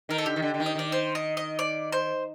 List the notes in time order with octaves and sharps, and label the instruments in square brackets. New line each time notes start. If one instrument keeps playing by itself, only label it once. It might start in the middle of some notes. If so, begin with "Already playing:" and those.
[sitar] D#3 [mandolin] A#4
[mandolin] A4
[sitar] D3 [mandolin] G4
[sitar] D#3
D3
D3
D#3
[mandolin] D#5
[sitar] D#3 [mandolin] D5
[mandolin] C5
D#5
D#5
D5
C5